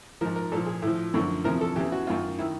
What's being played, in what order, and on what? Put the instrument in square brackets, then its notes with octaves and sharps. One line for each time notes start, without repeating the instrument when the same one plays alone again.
[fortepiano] G#2 F3 A#4
A#4
A#2 A4
F3
G#4
A2 F3
F#2 D3 F3
E2 C3 F3 A#4
A4
E2 C#3 E3 G4
F#4
F#2 D#3 F4
D#3 E4